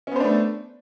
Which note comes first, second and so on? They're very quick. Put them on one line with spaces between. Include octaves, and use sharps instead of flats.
C#4 B3 C5 D4 A3